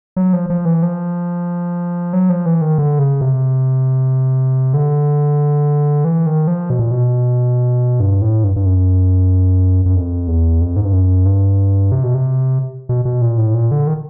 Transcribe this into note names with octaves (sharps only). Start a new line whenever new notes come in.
F#3
F3
F3
E3
F3
F#3
F3
E3
D#3
D3
C#3
C3
D3
E3
D#3
F3
B2
A#2
B2
G2
A2
G2
G2
F#2
F#2
F2
E2
F2
G#2
G2
F#2
G2
C3
B2
C3
B2
B2
A#2
A2
A#2
D3
D#3